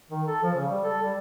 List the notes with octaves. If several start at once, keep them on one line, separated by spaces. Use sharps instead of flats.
D#3
A4
F3
C#3
G3
A4
G3